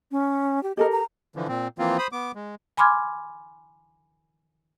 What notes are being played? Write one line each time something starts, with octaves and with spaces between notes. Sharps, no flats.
C#4
G4
G4 A4 A#4 D#5
A#5
D3 E3 F3
A#2 C4
E3 F3 A#3 C4 F4
C5 B5 D#6
B3 D6
G#3
G#5 B5 C6 D6 F6 G#6